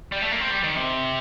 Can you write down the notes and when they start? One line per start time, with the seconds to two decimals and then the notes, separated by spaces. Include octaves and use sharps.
0.12 G3
0.22 A3
0.32 A#3
0.41 C4
0.51 G3
0.64 D#3
0.76 C3